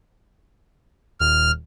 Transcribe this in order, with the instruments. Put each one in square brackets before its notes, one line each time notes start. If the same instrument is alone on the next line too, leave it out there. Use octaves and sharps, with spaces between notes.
[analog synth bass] D#1 [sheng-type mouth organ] F6